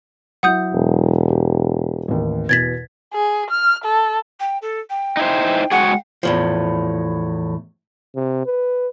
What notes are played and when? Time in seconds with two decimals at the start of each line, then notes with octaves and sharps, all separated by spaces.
0.43 F#3 E4 E5 F#5 D#6 G6
0.74 E1
1.29 G4
2.08 A1 D#2
2.49 E2 B2 G#6 A6 B6
3.14 G#4
3.51 F6
3.84 A4
4.39 G5
4.62 A4
4.90 G5
5.17 D#4 E4 C5
5.71 G#3 F#4 G#4 F#5
6.23 E2 A2 F3
8.15 C3
8.46 B4